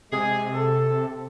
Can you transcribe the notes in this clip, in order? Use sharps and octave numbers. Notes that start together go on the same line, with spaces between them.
C3 G#3 G#4
A4